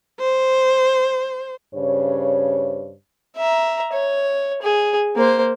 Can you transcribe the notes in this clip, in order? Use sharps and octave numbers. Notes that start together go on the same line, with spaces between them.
C5
G2 C#3 C5 C#5
E5 A#5
C#5
G#4
A#3 C5